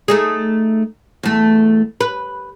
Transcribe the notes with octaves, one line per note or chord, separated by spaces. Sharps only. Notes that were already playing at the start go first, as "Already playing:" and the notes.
A3 D#4 G#4
E2 A3
B4